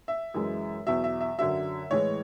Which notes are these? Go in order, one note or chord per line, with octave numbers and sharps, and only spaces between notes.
E5
F#2 E3 G#3
E2 B2 F#3 E5
E5
E5
F#2 D3 F#3 E5
A2 E3 G#3 C#5